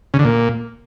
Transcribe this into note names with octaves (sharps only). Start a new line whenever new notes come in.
C#3
D3
A#2